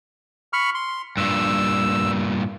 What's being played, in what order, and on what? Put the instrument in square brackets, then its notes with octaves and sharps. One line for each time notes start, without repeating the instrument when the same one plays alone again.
[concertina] B5 C#6 F6
C6
[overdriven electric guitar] G2 A#2 [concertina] E6